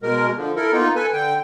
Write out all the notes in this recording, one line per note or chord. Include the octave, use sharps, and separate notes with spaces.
B2 G#3 A#4
D3 F3
E4 A4 A#4
A#3 B3 D#4 F4
A4 B4 G#5
D3 G5